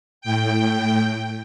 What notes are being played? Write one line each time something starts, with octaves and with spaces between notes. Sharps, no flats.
A2 G5